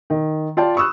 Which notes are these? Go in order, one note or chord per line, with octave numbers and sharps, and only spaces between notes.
D#3
F4 D5 G5 A5
B5 C#6 D#6 E6 F#6